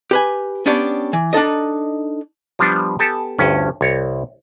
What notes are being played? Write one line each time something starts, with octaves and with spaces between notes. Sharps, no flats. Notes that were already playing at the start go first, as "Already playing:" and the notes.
G4 B4 G#5
B3 C#4 D4 G4 C#5 D5
E3
D4 D#4 A4 D#5
F3 G3 B3 D4
B3 G4 A4 G#5 A5
G1 D2 G2 C#4
C2 C#5